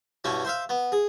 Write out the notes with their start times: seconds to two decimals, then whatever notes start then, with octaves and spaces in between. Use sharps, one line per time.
0.24 G2 B2 C#4 E4
0.45 C5 E5 F5
0.69 B3
0.92 G#4